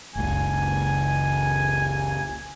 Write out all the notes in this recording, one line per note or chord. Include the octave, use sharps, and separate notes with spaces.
F#1 C#2 G#5